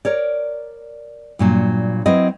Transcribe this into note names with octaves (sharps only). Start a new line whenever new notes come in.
A#4 C#5 D5
G2 A#2 F#3
F#3 C4 E4 B4 D#5